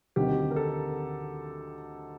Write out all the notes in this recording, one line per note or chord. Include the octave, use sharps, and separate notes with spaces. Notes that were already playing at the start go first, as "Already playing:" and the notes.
D2 C3 D#3 G4
A#4
A4